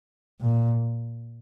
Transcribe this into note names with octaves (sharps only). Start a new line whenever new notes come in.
A#2